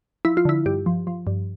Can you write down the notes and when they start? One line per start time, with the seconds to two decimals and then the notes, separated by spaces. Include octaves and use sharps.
0.25 F3 E4
0.37 F4
0.45 D3 E4
0.66 G2 G4
0.86 F3
1.07 F3
1.27 G2